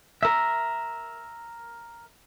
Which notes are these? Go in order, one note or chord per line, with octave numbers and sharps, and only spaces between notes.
A#4 E5